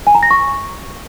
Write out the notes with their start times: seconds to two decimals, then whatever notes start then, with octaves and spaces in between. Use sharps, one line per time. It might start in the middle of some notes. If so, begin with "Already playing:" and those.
0.07 G#5
0.15 A#5
0.23 A#6
0.31 C#6